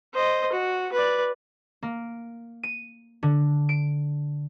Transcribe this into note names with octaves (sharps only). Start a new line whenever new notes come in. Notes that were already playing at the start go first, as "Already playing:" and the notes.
C5 D#5
F#4
B4 D5
A#3
D#7
D3
D7